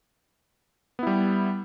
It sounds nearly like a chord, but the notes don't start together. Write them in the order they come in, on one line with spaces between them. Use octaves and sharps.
B3 E4 G3